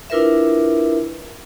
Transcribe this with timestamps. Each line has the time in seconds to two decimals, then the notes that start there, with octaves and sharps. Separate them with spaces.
0.10 D4 E4 F4 A#4 B4 E5